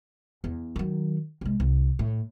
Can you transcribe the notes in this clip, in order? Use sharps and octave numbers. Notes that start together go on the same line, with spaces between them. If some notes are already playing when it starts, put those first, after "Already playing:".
E2
D#3 F#3
C2 G#3
C2
A2